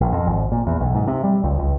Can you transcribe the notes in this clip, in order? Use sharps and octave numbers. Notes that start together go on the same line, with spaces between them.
A#1
F2
G#1
A#2
E2
B1
G#2
C3
G3
C#2
C#2